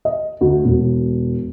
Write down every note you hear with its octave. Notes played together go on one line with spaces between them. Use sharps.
D#5
D2
E1